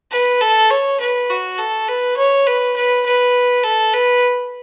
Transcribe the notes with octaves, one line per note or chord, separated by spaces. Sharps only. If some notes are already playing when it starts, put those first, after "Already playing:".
B4
A4
C#5
B4
F#4
A4
B4
C#5
B4
B4
B4
A4
B4